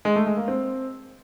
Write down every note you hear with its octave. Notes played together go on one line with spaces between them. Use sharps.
G#3
A3
G#3
A#3
C4